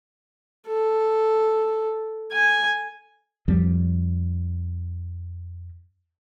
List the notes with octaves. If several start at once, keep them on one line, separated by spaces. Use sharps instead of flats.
A4
G#5
F2 F3 G3 C4